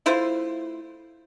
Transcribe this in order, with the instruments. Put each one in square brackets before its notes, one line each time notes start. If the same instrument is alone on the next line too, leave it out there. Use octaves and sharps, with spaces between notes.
[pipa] A3 E4 F4 C5